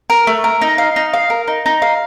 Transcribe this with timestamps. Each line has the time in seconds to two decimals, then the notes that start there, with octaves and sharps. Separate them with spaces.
0.10 A#4
0.27 A3
0.44 A#4
0.61 D#4
0.78 F5
0.96 D#4
1.14 F5
1.30 A#4
1.48 D#4
1.66 D#4
1.82 F5